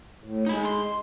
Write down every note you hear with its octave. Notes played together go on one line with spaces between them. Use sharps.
A2
G#3 D#4 B5
C6